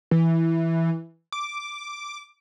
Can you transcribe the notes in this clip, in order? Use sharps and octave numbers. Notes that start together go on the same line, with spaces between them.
E3
D6